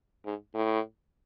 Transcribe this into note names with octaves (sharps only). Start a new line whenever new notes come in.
G#2
A2